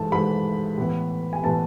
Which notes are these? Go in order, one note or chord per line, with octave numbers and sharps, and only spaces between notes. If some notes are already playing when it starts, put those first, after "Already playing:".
Already playing: G#2 E3 A3 A5
G#2 E3 A3 B5
A2 E3 B3
G#5
A2 E3 B3 A5